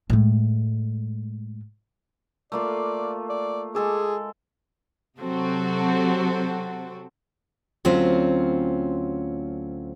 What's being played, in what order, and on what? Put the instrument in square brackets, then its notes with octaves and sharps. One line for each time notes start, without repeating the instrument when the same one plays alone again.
[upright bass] A2 G#3
[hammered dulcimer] A3 A#3 F4 [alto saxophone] D5
[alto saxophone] D5
[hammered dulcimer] G#3 A4 D6 [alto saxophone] G#4
[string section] C3 F#3 C4 F#4 A4
[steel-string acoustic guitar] D2 F#3 C4 C#4 F4